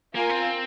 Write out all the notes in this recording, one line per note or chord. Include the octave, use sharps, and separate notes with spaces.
A#3 F4 A#4 F5 G#5
C4